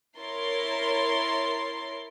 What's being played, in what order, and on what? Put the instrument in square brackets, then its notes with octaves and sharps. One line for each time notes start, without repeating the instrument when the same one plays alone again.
[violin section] E4 A#4 C#5 C6 A6